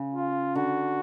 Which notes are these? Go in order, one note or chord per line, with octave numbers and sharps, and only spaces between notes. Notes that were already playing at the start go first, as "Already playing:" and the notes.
Already playing: C#3
F4
D3 F#4